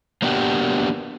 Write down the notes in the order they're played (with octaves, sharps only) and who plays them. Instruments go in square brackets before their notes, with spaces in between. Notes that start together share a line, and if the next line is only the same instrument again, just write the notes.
[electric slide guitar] A#3 B3 D4 F#4 G4